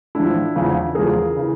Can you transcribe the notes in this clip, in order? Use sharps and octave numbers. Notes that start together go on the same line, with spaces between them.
A2 F3 D4 E4
E2 C#3 F3
E2 C#3 F3 G#4 A#4
C#3 E3